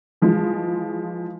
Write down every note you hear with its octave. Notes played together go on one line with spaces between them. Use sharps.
E3 F3 G#3